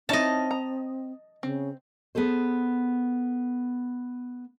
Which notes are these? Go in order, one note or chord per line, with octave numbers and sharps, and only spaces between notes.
C4 C#4 D#4 E4 D#5 A5
A#5
C#3 C4
B3 G#4 A4 C5